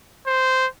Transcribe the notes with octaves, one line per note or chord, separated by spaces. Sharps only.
C5